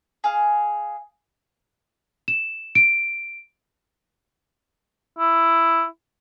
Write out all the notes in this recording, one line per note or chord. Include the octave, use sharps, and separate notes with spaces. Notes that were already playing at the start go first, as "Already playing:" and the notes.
G#4 F5
E7
D7
E4